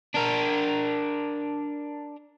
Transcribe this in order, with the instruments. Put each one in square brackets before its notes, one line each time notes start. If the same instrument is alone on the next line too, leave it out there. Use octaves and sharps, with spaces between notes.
[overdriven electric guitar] D4 A#4